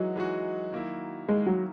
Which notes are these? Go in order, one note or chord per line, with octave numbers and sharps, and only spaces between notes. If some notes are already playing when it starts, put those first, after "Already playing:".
Already playing: E3 F#3 G#3 D#4 F#4
E3 G#3 D#4 F#4
D#3 A#3 E4
D#3 G#3 A#3 E4
F#3